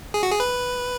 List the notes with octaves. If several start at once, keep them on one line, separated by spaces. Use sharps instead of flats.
G#4
F#4
G#4
B4